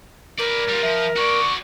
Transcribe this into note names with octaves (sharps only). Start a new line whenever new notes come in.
A#4 B4 D5
G3 F4
F3 E5
F#4 D5 C#6